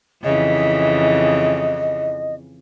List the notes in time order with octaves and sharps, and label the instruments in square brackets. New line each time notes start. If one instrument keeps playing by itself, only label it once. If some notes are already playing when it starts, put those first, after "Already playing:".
[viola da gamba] F2 C#3 E3 [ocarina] D#5